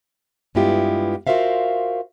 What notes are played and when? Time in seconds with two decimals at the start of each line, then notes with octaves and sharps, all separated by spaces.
0.55 G2 G#3 B3 E4 F4 G4
1.27 F4 F#4 A#4 C5 E5 F5